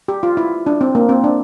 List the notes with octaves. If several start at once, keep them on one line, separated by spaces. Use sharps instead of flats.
G4
F4
E4
D4
C4
A#3
C4
D4